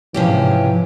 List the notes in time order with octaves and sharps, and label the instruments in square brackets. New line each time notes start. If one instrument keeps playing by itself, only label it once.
[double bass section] G#2 C3 [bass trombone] E3 [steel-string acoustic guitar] F3 C#4 G4